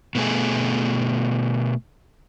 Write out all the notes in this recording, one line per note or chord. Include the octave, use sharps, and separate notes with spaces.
B2 A3 G#4